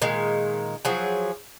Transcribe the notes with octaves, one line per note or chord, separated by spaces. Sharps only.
A#2 D#3 G#3
F3 F#3 G#4